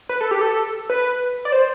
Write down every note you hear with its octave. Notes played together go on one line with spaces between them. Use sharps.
B4
A4
G4
A4
B4
D5
C5